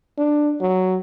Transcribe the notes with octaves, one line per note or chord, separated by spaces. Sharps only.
D4
F#3